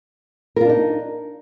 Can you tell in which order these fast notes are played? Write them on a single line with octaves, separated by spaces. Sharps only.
A#4 F4 D4 D#4